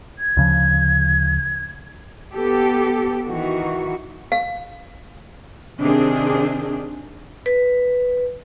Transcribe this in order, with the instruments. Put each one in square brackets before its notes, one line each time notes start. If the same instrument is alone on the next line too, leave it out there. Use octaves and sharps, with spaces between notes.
[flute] G#6
[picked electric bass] D2 C#3 F3
[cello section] B3 G4 A4
D#3 E3 F#4
[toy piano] F5
[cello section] C3 D#3 C4 D4 G#4
[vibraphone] B4